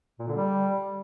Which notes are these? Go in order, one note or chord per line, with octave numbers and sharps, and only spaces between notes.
A#2
D3
G3